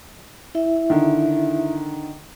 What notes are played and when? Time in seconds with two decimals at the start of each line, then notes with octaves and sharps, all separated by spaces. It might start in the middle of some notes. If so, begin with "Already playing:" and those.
0.55 E4 E5
0.90 D3 D#3